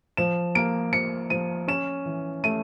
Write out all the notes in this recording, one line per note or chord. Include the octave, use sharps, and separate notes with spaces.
F3 E7
A#3 D7
F3 C#7
F3 D#7
C#4 E7
E3
A3 D#7